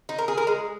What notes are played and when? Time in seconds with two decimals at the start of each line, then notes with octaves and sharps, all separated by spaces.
0.09 D#4
0.19 A#4
0.28 G#4
0.38 A#4
0.47 G#3